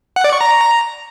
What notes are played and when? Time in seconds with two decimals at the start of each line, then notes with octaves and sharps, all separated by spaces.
0.16 F#5
0.24 D5
0.33 C#6
0.41 A#5